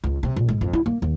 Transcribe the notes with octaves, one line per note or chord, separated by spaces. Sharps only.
C#2
C3
A#1
G#2
F2
E4
A#3
D#2